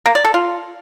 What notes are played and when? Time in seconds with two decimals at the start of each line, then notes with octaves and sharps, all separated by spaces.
0.06 A#3
0.15 D5
0.25 A4
0.34 F4